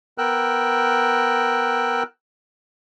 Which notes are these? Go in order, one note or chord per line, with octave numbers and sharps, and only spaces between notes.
B3 A#4 G5 E6 F#6